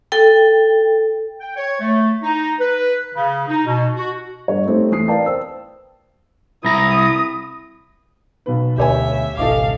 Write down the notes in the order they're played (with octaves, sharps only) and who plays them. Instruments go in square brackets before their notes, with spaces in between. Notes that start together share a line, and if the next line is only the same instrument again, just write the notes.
[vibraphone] A4 G5
[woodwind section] G5
C#5
A3
D#4
B4
C#3
D#4
B2
F#4
[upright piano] G2 C#5
A3 C4 D#4 G4
E3 A3 D#6 C7
A#4 B4 D5 F5 G5 A5
C5 E6
[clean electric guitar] C2 A#5 [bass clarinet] E4 [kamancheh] D#6
[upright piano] B1 B2 B4
[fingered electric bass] D2 [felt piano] G4 C#5 G#5 [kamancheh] E5
[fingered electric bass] G#1 C#2 B2 [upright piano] A4 D#5 D6 [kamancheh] F5